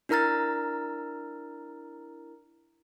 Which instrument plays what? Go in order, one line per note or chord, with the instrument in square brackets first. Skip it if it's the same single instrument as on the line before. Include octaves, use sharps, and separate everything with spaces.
[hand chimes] D4 E4 A#4 A#5 F6 A6